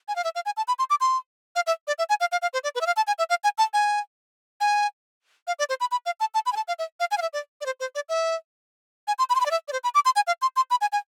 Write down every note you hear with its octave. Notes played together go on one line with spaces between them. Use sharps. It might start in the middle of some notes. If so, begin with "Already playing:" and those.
G#5
F5
E5
F5
G#5
A5
B5
C6
D6
C6
F5
E5
D5
E5
G#5
F5
F5
F5
C5
D5
B4
E5
F5
A5
G#5
E5
F5
G#5
A5
G#5
G#5
F5
D5
C5
B5
B5
F5
A5
A5
B5
G#5
A5
F5
E5
F5
G#5
F5
E5
D5
D5
C5
C5
D5
E5
G#5
C6
B5
C6
B5
D5
E5
D5
C5
B5
D6
C6
G#5
F5
C6
C6
B5
G#5
G#5